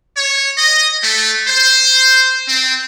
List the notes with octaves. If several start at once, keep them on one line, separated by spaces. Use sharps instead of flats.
C#5
D#5
A3
C5
C4